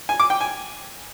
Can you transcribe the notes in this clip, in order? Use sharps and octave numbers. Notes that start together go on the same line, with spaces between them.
G#5
D6
G5
G#5